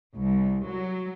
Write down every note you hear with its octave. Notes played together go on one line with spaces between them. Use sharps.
C2
F#3